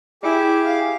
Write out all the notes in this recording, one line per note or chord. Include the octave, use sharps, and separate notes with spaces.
E4 G4 G#4 D6
F5